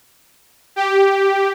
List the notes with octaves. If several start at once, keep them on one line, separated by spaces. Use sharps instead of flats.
G4